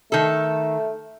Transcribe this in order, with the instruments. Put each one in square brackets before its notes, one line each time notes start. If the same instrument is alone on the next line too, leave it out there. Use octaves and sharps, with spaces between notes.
[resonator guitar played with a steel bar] D#3 A4 [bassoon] A3